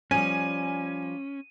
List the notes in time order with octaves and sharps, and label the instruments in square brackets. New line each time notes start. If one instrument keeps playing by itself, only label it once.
[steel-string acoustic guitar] F3 G3 [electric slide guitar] C#4 [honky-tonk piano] G#5 [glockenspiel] D#7